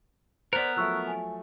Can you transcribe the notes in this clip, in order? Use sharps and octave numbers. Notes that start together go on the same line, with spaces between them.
B3 A#4 C5 D5 F#6 B6
F3 F#3 A3 C#6 E6 F#6
G#5